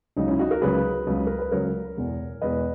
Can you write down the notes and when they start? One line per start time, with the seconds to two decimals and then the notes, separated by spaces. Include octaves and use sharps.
0.17 C#2 C#3 F#3 D#4
0.28 C#4 E4
0.39 D#4 F#4
0.51 F#4 A#4
0.61 C#2 C#3 F#3 G#4 B4
1.07 C#2 C#3 F#3
1.27 A#4
1.39 B4
1.52 C#2 C#3 F#3 A#4 C#5
1.97 E2 B2 G#3
2.41 E2 B2 G#3 B4 D#5